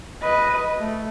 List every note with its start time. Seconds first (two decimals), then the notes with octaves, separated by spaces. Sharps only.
0.23 B4 D#5
0.79 A3